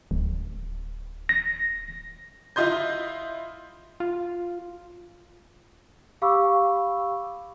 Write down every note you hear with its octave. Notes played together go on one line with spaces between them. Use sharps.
D1
A#6
E4 F4 D#5 C6 G6
F4
G4 F5 B5 C#6 D6 E6